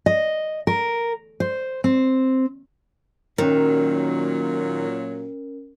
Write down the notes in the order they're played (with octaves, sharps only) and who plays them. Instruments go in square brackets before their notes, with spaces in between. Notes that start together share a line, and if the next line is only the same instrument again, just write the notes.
[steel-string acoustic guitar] D#5
A#4
C5
C4
[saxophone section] A#2 F#3 [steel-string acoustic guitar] D#3 [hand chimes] C#4 A#4